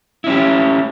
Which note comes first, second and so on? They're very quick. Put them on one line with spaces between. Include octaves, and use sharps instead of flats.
E4 C#4 G4